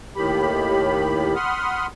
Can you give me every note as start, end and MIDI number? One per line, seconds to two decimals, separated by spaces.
0.16 1.35 39
0.16 1.35 45
0.16 1.35 51
0.16 1.35 67
0.16 1.35 83
1.35 1.87 78
1.35 1.87 83
1.35 1.87 84
1.35 1.87 87
1.35 1.87 89